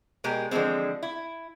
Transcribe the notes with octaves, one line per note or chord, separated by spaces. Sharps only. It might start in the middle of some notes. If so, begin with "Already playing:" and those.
B2 G#3 G4 A#4
D3 E3 F3 G#3 C4
E4